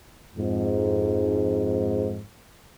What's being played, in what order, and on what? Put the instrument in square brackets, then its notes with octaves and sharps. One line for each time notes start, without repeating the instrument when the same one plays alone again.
[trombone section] F2 G#2